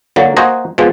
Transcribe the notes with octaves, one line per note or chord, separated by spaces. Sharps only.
D3 F#3 A#3
A#3 F#4 C5 D#5 G#5 A#5
B2 F3 G#3